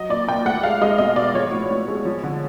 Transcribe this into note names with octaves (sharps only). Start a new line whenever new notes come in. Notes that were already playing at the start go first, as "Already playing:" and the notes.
Already playing: F#3 D#5
A#2 D5
A#2 G5
A3 F#5
G#3 F5
G#3 D#5
B2 D#5
B2 D5
F3 C#5
A2
A2
G#3
F3
D3